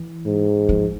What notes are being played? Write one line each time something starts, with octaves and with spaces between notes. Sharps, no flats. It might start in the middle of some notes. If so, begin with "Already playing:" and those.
Already playing: E3
G#2
F3